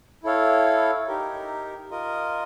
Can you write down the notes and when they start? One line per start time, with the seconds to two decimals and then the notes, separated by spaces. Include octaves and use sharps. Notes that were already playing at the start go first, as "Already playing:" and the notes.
0.24 E4 A4 C#5 F5
1.07 D#4 G4 A#4
1.91 F4 A#4 D#5